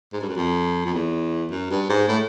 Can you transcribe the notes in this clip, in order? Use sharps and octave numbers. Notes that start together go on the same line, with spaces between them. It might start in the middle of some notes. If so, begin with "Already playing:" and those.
G#2
G2
F#2
F2
F2
E2
F#2
G2
G#2
A2